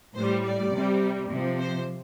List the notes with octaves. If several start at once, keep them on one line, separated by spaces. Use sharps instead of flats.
A2 G3 C5
D5
C3 G3
C3 F3
C5